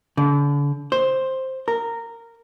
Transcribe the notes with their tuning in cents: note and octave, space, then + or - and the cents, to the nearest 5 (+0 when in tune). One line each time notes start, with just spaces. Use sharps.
D3 -40
C5 +5
A#4 -15